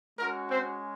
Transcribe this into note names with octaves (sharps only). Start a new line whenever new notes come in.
G#3 C#4 F#4 A#4
C4 C5